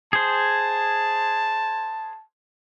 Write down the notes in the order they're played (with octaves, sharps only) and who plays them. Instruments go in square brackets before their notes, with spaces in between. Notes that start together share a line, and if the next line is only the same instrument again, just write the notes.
[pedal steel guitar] G#4 C5 [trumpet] A5